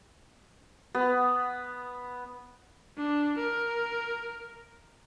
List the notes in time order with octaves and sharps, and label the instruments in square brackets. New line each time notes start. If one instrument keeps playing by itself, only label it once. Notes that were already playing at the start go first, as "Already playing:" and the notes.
[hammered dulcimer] B3
[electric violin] D4
A#4